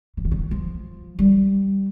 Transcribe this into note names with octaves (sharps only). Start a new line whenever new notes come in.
E3
D#3
D3
D#3
F3
G3